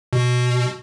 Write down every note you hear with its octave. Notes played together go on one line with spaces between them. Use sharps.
B2